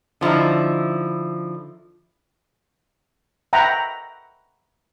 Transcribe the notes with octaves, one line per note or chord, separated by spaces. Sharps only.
D3 F3 D#4 E4
E5 F#5 G5 A#5 B5